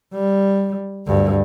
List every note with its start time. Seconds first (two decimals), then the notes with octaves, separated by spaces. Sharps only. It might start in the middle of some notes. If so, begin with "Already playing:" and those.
0.14 G3
1.07 D2 G2